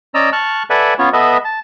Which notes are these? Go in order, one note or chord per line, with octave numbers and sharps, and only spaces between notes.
C#4 D5 D#5 A#5 E6
A5 C#6 F6 F#6
A4 B4 D5 E5 F#5 G#5
B3 C#4 F4 C#5
B3 A4 B4 D#5 E5 B5
A5